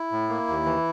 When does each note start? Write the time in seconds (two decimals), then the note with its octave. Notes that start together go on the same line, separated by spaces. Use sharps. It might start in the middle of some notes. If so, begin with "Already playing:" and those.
Already playing: E4
0.12 A2
0.29 A#3
0.48 D#2
0.65 E3